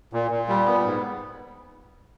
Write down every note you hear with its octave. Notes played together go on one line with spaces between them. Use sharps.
A#2
A#2
G3
B3
G#2